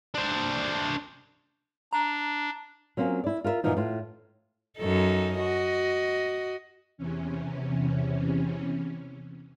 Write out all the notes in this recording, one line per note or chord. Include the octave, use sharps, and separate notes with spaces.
D4 C5
D4 A#5
F#3 A#3 C4 C#4 F4
E4 D5
F4 A#4 B4 E5 F5
F#2 A#2 E3 F3 D#4
A2 F4
F#2 D#4 A4
F#4 D#5
E2 C3 E3 C#4